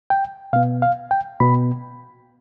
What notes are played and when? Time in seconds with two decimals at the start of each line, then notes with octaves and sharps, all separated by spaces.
0.10 G5
0.53 B2 B3 F5
0.82 F5
1.11 G5
1.40 B2 B3 B5